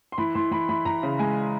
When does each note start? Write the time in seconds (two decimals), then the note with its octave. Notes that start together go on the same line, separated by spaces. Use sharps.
0.12 C6
0.18 E3 B5
0.35 E3 C6
0.51 E3 B5
0.69 E3 B5
0.85 E3 A#5
1.03 C#3
1.19 G#3 G#5